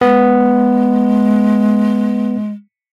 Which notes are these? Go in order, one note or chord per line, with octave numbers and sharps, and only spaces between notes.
G#3 B3